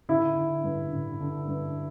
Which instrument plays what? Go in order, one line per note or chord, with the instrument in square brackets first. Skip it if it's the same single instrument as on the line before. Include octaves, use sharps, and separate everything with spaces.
[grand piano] D3 E4
D3
G2
D3
D3
G2